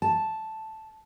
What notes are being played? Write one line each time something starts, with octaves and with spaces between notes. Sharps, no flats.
A5